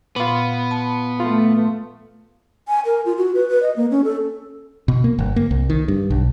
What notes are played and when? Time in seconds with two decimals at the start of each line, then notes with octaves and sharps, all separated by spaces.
0.16 A#2 B3 F4 B5
0.71 A5
1.20 A3 F4
2.67 G#5
2.85 A#4
3.06 F4
3.17 F#4
3.35 B4
3.49 B4
3.63 D#5
3.76 A#3
3.91 C#4
4.04 A4
4.88 B2
5.04 A#3
5.19 G1
5.36 A#3
5.51 C2
5.70 D#3
5.88 G2
6.10 B1